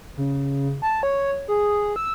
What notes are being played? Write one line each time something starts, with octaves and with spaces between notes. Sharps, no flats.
C#3
A5
C#5
G#4
E6